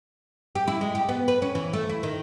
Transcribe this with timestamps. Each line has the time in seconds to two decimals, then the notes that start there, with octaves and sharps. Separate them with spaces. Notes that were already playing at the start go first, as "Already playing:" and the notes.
0.55 G4
0.68 E4
0.81 G#3
0.95 G4
1.09 B3
1.28 B4
1.42 C#4
1.55 E3
1.73 A3
1.89 E4
2.03 D#3